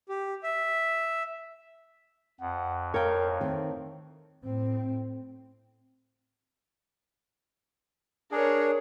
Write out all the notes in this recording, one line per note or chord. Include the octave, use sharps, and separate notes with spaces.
G4
E5
F2 F#5
A#4 C#5 F5 G5
D#3 A3 C4
A2 C4
D4 G#4 A#4 C#5